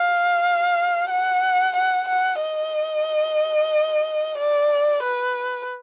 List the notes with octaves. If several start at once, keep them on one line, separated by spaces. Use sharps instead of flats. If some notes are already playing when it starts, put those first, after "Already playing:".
Already playing: F5
F#5
F#5
F#5
D#5
D5
B4